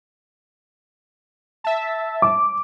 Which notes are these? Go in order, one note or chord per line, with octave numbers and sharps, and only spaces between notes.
E5 A5
D6